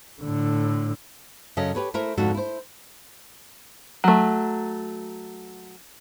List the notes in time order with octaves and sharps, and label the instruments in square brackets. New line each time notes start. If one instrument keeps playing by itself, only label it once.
[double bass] A2 D3
[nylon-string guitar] F#2 C#3 C#4 A4 D#5
G4 B4 C#5
A3 E4 A#4 C5
F2 G#2 D3 F#4 A4
E4 C5
[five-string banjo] F#3 A3